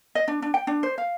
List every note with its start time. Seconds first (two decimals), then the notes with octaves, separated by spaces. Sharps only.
0.15 D#5
0.28 D4
0.42 D4
0.54 G5
0.67 D4
0.83 C5
0.98 F5